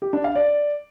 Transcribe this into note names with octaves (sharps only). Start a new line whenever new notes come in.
G4
D4
F5
D5